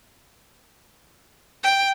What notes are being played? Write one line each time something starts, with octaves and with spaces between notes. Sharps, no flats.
G5